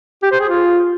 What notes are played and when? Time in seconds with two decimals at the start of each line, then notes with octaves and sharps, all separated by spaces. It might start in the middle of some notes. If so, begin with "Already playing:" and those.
0.23 G4
0.31 C5
0.40 G#4
0.49 F4